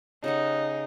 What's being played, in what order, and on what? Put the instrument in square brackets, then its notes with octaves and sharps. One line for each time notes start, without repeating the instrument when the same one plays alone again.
[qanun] C#3 G4 F#5 [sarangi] D#4